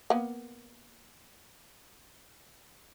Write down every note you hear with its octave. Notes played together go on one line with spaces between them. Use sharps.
A#3 B3